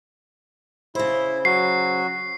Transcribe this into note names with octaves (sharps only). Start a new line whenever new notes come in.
C#3 E4 C5
F#3 F#4 C7